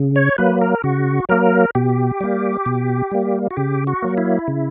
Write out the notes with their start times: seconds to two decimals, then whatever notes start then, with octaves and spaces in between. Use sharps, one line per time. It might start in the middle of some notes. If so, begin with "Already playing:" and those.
Already playing: C#3
0.16 C#5
0.38 F#3 A#3 B4
0.61 A#4
0.84 C#3 F#4
1.29 F#3 A#3 A#4
1.75 B2 G4
2.20 G3 A#3
2.66 B2
3.11 G3 A#3
3.51 F#4
3.57 C#3 G4
3.87 F#4
4.02 F#3 A#3
4.18 E4
4.48 C#3